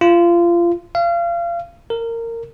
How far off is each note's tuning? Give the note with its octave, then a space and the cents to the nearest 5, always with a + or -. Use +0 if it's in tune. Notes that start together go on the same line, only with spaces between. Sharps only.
F4 -25
F5 -30
A#4 -20